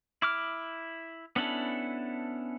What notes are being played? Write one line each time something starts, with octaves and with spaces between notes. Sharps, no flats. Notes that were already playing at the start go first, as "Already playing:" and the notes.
E4 D6 F6
B3 C#4 D4 E4 A4